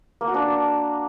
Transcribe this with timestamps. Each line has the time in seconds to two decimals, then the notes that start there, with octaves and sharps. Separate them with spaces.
0.21 A#3
0.28 F#4
0.34 D4